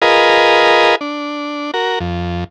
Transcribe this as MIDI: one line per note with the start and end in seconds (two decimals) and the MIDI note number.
0.02 0.95 65
0.02 0.95 68
0.02 0.95 70
0.02 0.95 71
0.02 0.95 75
1.01 1.71 62
1.74 1.99 66
1.74 1.99 70
2.00 2.44 41